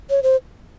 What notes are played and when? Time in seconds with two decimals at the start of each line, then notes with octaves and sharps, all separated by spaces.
0.10 C#5
0.23 C5